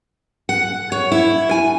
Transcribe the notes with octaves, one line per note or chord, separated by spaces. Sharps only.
F#5
C#5
E4
G#5